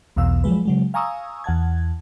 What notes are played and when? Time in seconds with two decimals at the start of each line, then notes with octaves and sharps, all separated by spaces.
0.17 B1 E2 B2 F5 E6
0.44 F3 F#3 G#3 B4
0.65 C#3 F#3 G#3
0.94 F5 G#5 A#5 C#6 D#6 E6
1.44 E2 F#5 A5 G#6